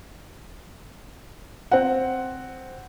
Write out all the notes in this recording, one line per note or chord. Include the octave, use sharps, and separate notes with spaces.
C4 F#5